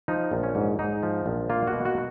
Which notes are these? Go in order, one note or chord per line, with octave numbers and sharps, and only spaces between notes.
F3 D#4
A#1
C#4
G#2
G#2 D#4
F3
A#1
A#3 F4
F#4
B2
F#4